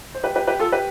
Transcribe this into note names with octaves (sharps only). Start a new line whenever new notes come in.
C5
G4 B4
G4 B4
G4 B4
F4 A4
G4 B4